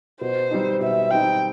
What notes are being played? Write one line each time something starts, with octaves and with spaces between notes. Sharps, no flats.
B2 C5
G3 C4 D#4
B2 E5
G3 C4 D#4 G5